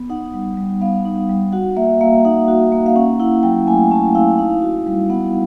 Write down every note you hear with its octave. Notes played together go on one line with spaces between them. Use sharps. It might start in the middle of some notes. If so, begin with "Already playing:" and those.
Already playing: B3
D#4 F#5
G3
G3
B3 F5
D#4
G3
F#4 F#5
A#3 E5
A#3 F5
D#4 F#5
F#4
A#3
F5
C#4 F#5
E4 F#5
F#3 G5
A3 G#5
C#4 A5
E4 F5
D#4 F5
F#4
G3
B3 F#5